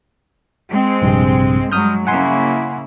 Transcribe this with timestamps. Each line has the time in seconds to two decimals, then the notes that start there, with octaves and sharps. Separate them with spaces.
0.70 G#3 C4
1.02 A#1 G2 C3
1.72 G2 F#3 G#3 D#6 F6 G6
2.07 C#3 A#3 E4 F#5 G#5 C6